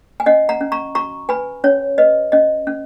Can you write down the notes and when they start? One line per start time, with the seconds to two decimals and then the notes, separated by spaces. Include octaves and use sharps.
0.20 G#5
0.26 C#4 D#5 F#5
0.49 F#5 A#5
0.61 C#4
0.72 A#5 C#6
0.95 F#4 A#5 C#6
1.29 B4 G#5 B5
1.64 C#4 C#5
1.98 B4 D#5
2.32 C#4 D#5
2.67 C#4